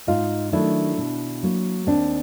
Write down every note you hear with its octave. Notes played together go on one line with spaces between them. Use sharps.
G#2 D#4 F4
D#3 F#3 A3 D4 E4
B2
F#3 A#3
D#2 C4 D4